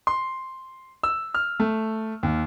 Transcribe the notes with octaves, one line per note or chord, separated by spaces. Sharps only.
C6
E6
F6
A3
D#2